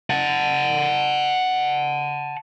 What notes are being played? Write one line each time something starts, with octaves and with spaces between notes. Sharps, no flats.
F#5 A5